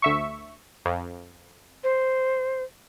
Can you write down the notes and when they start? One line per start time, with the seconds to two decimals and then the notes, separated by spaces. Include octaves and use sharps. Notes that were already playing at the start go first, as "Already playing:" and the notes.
0.02 D2 E5 C#6
0.85 F2
1.84 C5